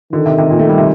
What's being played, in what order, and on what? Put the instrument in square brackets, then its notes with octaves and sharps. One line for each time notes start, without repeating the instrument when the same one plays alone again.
[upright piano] D3 [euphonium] D#3
[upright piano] C3
C3
A#2
A3
G3
C3